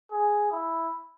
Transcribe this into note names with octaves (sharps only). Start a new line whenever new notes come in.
G#4
E4